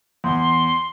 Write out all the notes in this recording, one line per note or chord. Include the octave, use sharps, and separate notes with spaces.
E2 C6